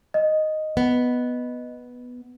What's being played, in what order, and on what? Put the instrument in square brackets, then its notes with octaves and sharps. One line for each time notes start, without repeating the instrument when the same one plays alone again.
[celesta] D#5
[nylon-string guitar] B3